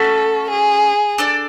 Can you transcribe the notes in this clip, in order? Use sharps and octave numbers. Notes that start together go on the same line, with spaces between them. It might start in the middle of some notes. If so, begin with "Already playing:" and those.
Already playing: A3 C#4 F#4 A4
G#4
D4 A4 D5